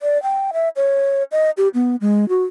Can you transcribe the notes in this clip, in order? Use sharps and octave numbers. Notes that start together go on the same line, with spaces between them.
D5
G5
E5
C#5
D#5
G4
B3
G#3
F#4